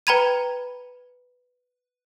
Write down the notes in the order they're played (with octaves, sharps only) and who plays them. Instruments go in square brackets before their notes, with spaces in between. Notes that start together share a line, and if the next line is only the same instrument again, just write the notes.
[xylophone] B4 G5 A#5 B5 G#6 D#7